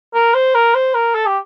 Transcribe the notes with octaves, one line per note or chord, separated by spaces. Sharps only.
A#4
C5
A#4
C5
A#4
A4
G4